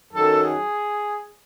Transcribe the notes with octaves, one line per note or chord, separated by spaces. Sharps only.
F#2 D#3 F#3 A4
G#4